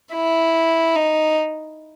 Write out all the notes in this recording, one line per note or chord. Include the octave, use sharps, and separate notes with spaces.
E4
D#4